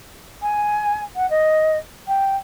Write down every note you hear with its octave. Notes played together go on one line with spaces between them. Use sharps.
G#5
F#5
D#5
G5